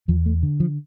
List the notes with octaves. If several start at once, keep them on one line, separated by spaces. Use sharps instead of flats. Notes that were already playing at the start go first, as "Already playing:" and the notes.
E2 F3
A3
D3
F3